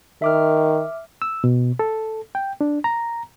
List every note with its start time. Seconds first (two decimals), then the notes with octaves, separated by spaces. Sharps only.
0.22 D#3 E5 D6 F6
1.22 E6
1.44 B2
1.79 A4
2.35 G5
2.61 D4
2.84 A#5